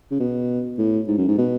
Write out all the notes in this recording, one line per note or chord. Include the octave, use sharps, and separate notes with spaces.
C#3
B2
A2
G#2
F#2
G#2
B2